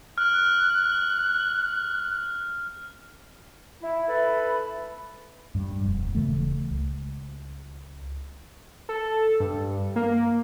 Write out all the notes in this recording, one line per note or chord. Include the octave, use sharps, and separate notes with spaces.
F6 F#6
E4
E4 A4 B4 B5
G2 G3
D#1 F2
D#1 C#3 E3 A3
C#2
A4
G2
A#3